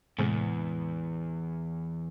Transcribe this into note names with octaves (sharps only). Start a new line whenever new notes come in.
E2 A2 C3 G#3